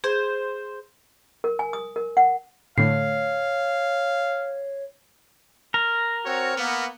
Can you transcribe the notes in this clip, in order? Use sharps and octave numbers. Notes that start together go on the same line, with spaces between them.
G#4 C5
A#4
G#5
D#6
A#4
F#5
A2 D3 A3 C#5 F5 C7
A#4
C4 F#4 C#5
A#3 B3